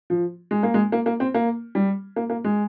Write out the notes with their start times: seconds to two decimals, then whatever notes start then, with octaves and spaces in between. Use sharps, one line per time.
0.10 F3
0.51 G#3
0.63 A#3
0.74 G#3
0.92 A#3
1.06 A#3
1.20 C4
1.34 A#3
1.75 G3
2.16 A#3
2.30 A#3
2.44 G#3